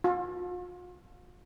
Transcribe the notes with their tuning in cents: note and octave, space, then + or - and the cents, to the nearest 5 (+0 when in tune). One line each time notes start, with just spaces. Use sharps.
F4 +40